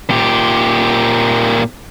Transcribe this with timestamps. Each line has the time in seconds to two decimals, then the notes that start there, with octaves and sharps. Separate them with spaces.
0.10 A#2 G4